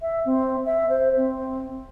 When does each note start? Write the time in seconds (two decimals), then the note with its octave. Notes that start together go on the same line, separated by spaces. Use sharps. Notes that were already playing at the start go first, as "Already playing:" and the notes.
0.02 E5
0.25 C4
0.66 E5
0.89 C5
1.17 C4